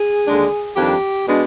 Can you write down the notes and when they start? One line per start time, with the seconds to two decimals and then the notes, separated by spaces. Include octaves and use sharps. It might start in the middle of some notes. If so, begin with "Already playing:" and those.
Already playing: G#4
0.27 D#2 D3 G#3 D4
0.76 F2 D#3 G3 D4 G4
1.26 B2 G#3 D4